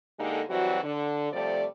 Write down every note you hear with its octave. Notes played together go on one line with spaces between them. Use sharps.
D3 G#3 A#3 D#4 G4 A4
E3 F#3 G3 C4 F#4
D3
C3 F3 G3 A3 D5